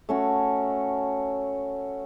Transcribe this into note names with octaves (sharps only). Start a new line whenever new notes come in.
A3 C#4 F#4